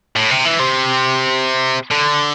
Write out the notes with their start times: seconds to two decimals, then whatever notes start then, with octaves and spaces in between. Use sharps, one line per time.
0.16 A2
0.31 C3
0.45 E3
0.59 C3
1.91 D3